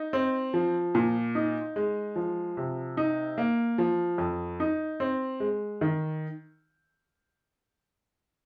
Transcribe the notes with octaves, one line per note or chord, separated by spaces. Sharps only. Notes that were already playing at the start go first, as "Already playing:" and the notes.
Already playing: D#4
C4
F3
A#2
D#4
G#3
F3
C3
D#4
A#3
F3
F2
D#4
C4
G#3
D#3